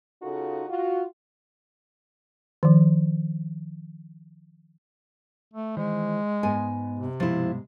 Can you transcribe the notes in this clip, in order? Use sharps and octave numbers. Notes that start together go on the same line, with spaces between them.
C#3 D#4 F4 F#4 A4
F4 F#4
D#3 F3
A3
D#3 E3 G#3 C5
G#2 B3 G#5
C3
G2 B2 F3 G#3 E4